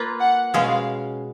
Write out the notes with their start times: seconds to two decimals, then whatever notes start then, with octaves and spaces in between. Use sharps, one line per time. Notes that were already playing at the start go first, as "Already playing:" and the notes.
Already playing: A#3 F4 B4
0.20 F#5
0.54 B2 G#3 C#4 G#4 F5